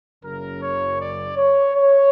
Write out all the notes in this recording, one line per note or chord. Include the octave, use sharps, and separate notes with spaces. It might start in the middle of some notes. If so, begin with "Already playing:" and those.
F#1 F#2 C#3 A#4
C#5
D5
C#5
C#5